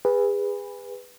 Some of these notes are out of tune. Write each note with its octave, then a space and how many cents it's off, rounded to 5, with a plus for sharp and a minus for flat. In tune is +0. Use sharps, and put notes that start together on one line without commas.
G#4 -30 B4 +0